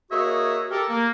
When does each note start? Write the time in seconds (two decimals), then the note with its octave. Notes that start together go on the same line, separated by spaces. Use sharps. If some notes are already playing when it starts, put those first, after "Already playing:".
0.11 A#3 F#4 G#4 C#5 D#5 E5
0.71 G4 A4 A#4
0.89 A#3